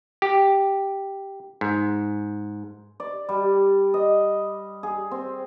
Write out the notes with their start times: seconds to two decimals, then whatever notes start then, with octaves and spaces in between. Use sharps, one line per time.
0.22 G4
1.61 G#2
3.00 D5
3.29 G3
3.94 D#5
4.83 G#4
5.11 C4